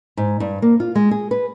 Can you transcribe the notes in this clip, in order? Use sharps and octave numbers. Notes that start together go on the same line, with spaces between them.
G#2
G2
A#3
F4
G#3
G#4
B4